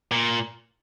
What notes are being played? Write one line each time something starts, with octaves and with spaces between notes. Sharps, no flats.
A#2